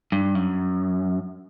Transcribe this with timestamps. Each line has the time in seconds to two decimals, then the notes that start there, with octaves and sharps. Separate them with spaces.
0.12 G2
0.35 F#2